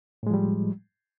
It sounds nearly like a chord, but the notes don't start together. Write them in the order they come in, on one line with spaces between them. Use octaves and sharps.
A2 G#3 F3 G3